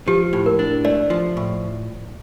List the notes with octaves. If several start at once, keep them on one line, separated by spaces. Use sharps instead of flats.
F3 G4
A2
A#4
D4
A3 D5
F3
A2